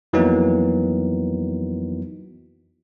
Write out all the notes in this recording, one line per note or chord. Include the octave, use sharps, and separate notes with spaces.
F2 E3 F#3 A#3 B3 D#4